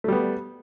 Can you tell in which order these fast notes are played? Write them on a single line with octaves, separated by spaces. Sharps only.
A3 G3 B3